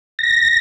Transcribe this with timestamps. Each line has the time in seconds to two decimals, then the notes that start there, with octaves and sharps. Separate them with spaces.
0.19 A#6